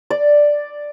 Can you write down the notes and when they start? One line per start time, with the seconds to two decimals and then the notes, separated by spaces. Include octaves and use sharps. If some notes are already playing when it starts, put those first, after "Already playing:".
0.10 D5